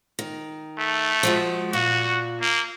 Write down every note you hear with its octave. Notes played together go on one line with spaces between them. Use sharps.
D#3
A3
F3 G#3 F#4
A#2 F#4
A#3